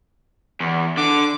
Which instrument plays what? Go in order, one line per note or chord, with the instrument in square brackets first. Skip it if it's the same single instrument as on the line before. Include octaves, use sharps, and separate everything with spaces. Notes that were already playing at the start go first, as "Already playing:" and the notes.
[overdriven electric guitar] E2
[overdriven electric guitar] D3 [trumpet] D6